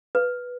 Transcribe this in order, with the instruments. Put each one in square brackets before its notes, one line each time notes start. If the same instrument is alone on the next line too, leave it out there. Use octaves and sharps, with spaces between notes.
[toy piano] B4